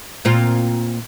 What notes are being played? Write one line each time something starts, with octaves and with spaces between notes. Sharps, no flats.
A#2 C4 F4